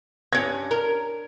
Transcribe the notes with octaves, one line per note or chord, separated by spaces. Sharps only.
G2 C#4 G#6
A#4